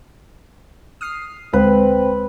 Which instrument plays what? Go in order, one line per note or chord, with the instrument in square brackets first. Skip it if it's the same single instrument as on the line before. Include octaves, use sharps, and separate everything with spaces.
[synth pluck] D#6 F6 C7
[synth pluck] D2 [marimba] G#3 [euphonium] C4 [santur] B4